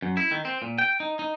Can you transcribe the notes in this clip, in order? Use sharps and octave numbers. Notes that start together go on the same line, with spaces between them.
F#2
E4
D#3
C4
A#2
G5
D#4
D#4